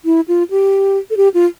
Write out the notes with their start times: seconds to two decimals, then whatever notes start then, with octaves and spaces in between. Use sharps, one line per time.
0.05 E4
0.28 F4
0.50 G4
1.10 A4
1.17 G4
1.34 F4